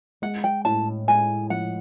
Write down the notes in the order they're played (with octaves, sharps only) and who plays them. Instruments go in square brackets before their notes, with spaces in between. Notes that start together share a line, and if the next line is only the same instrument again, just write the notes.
[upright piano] G#3 [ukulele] F#5
[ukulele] G5
[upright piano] A2 [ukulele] A5
[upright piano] G#3 [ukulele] G#5
[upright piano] F3 [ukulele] F#5